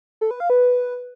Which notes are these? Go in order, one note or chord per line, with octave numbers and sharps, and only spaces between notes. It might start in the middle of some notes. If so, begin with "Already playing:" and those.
A4
B4
F5
B4